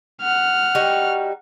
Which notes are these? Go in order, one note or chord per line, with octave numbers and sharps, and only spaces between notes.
F#5 F6
G3 D#4 F#4